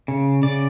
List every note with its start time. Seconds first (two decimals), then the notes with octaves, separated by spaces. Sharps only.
0.08 C#3
0.43 C#3 D5